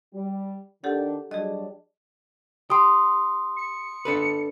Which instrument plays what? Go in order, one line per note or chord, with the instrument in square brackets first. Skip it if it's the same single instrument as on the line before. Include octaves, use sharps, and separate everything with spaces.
[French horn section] G3
[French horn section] D#3 D4 [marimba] G4 A4 F#5
[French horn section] F#3 G3 D4 [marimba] G#4 D#5
[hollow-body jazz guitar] G4 [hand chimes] C6 D#6
[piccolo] C#7
[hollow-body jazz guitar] D4 A4 B4